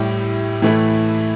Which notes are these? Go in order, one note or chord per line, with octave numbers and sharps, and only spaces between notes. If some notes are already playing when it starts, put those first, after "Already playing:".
Already playing: A2 G3 E4 G4
A2 E3 A3 E4